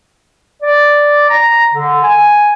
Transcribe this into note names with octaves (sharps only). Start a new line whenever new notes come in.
D5
A#5
D3
G#5